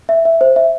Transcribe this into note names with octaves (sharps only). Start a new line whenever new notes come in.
E5
E5
C5
E5